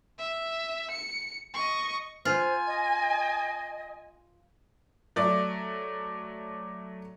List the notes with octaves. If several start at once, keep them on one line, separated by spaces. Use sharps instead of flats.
E5
C#7
D#5 C#6
F4 C5 G#5
D#5
F#3 A3 D5